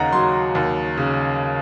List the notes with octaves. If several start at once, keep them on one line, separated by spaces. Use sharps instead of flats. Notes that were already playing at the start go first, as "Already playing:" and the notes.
Already playing: D#2 C#3 D#5 F#5 A#5
F#3 C6
D#2
C#3